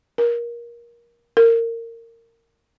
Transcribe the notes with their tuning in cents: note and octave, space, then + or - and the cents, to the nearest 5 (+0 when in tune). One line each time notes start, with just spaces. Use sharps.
A#4 +20
A#4 -25